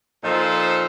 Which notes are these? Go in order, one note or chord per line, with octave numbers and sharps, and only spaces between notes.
A#2 F3 D#4 A4 C5